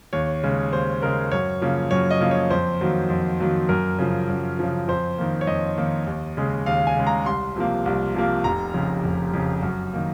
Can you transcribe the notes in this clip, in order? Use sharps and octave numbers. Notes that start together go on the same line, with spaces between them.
D#2 C#5
C#3 G#3
D#2 C5
C#3 G#3 A#4
F#2 C#5
C#3 F3 A#3
F#2 C#5
D#5
C#3 F3 A#3
C#5
F2 C5
D#3 F#3 A#3
F2
D#3 F#3 A#3
F#2 A#4
C#3 F3
F#2
C#3 F3
F2 C5
D#3 A#3
C#5
F2 D#5
D#3 A#3
D#2
C#3 G#3
D#2 F5
G#5
C#3 G#3
A#5
C2 C6
C3 F3 A#3
C2
C3 F3 A#3
F1 A#5
F2 C#3
F1
F2 C#3
F#2
D#3 A#3